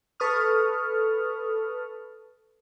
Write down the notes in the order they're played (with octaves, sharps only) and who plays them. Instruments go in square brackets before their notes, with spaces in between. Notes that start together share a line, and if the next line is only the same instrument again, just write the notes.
[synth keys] A4 B4 C#6 D#6 F6